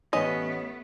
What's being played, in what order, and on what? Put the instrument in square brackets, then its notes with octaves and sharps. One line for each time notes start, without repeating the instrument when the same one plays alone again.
[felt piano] A1 B4 C#5 [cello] A3 B3 [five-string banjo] C#4 D#5